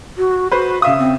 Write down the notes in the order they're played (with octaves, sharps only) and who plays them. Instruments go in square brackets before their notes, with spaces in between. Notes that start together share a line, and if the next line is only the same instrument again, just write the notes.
[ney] F#4
[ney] F#4 [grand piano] B4 C5
[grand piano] C#3 E5 D#6 [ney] F5
[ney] C4